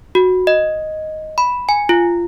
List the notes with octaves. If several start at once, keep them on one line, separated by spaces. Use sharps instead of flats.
F#4
D#5
B5
G#5
F4